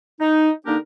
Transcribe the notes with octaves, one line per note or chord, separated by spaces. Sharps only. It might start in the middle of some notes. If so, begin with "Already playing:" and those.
D#4
D3 A#3 D4 D#4 G4 A#4